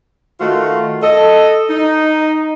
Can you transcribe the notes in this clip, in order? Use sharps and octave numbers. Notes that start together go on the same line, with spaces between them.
D#3 A3 F4 F#4
A4 D#5
D#4